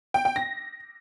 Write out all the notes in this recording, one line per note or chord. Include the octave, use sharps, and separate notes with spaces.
G5
G5
A#6